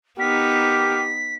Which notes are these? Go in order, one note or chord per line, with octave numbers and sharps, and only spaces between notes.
B3 D#4 G4 A#4 B6